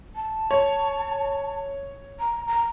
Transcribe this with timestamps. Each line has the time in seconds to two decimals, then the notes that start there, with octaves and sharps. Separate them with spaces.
0.15 A5
0.51 C#5
2.19 A#5
2.47 A#5